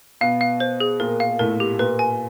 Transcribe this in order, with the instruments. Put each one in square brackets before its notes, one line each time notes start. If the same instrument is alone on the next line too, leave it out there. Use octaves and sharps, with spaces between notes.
[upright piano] B2 B3 [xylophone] F5
[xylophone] F5
C5
G#4
[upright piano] A#2 A#3 [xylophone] A#4
[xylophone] F5
[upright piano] A2 A3 [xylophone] A#4
[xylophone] G4
[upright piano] A#2 A#3 [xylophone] B4
[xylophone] G#5